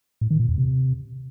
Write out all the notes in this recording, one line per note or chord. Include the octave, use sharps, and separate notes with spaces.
A2
D#3
A#2
E2
C3